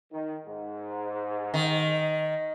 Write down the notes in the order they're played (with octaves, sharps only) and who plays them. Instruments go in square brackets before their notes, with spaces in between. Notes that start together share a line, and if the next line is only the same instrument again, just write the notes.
[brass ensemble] D#3
G#2
[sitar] D#3